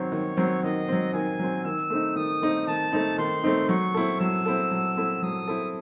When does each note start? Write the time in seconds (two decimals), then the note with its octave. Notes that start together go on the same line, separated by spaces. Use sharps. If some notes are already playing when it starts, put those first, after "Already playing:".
Already playing: D#3 F#3 C4 C#5
0.12 D#3
0.37 F#3 C4
0.63 D#3 D#5
0.88 F#3 C4
1.14 D#3 G#5
1.39 F#3 C4
1.64 D#3 E6
1.90 A3 C4 D#4
2.16 D#3 D#6
2.42 A3 C4 D#4
2.67 D#3 A5
2.93 A3 C4 D#4
3.18 D#3 C6
3.43 A3 C4 D#4
3.69 F#3 C#6
3.94 C4 E4 A4
4.20 F#3 E6
4.46 C4 E4 A4
4.71 F#3
4.97 C4 E4 A4
5.22 F#3 D#6
5.48 C4 E4 A4